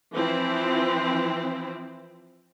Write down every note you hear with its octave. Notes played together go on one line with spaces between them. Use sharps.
E3 F3 C4 E4